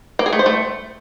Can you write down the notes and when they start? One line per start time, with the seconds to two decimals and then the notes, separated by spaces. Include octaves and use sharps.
0.19 A#3
0.26 G#4
0.33 A3
0.39 C5
0.46 A3